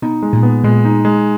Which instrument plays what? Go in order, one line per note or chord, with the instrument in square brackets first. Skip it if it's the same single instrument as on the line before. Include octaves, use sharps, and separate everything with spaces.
[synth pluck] B2 [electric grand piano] D#4
[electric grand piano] G#3
[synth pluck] A#2
[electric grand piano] B3
[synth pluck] A#2 [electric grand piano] G#3
[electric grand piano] D#4
G#3